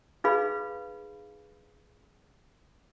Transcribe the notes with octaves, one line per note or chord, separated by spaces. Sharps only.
D#4 G#4 B4 F5 B5